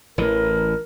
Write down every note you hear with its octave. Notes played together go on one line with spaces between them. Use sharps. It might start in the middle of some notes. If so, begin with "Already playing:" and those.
A1 E3 A#4